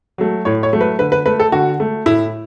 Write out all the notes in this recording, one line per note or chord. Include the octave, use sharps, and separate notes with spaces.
F#3 A3
A2 C#5
C#5
F#3 A3
B4
D3 B4
B4
A3 B4
A4
D3 F#4
A3
A2 E4